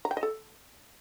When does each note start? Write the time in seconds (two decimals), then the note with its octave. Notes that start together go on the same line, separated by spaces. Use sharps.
0.05 A#5
0.11 G5
0.17 D#5
0.23 A4